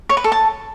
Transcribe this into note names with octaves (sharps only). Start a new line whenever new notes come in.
C#5
B4
A4
A5